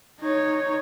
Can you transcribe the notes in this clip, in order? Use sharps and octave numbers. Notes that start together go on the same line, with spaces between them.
D#4 C#5